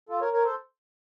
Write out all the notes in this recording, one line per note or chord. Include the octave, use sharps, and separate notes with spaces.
F4 A4
A#4 C#5
A#4 C#5
A4 C5